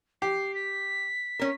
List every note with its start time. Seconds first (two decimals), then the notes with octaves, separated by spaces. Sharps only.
0.22 G4 C7
0.55 B6
1.39 C#4 A#4